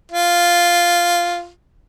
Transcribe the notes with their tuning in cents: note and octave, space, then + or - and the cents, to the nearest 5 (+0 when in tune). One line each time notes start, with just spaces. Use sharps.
F4 -5